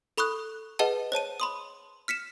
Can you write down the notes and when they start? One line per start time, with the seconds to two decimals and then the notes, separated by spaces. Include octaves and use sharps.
0.18 A4 B5 C#6 D#6 F#6
0.79 G#4 B4 D#5 F#5 A5
1.12 C5 C#5 A5 D#7
1.40 B5 C6 D#6
2.08 F6 B6 C#7 E7